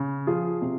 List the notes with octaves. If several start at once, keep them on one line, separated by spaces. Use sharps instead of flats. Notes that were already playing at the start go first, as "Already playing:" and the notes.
Already playing: C#3
F3 F4 G#4
C3